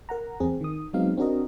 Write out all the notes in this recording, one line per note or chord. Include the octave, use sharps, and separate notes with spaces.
A#4 F#5 A#5
E2 C4 G#4
D#3 D#6
F#3 G#3 B3 C4 D#4 F5
C4 D4 F#4 A#4 D#5